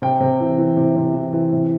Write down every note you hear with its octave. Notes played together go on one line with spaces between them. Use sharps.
C3 G5
C3
E3
E3
C3
C3
E3
E3
C3